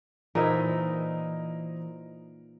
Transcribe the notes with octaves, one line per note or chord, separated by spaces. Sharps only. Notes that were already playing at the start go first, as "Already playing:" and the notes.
A#2 E3 D#4 E4 A#4 C5 D#5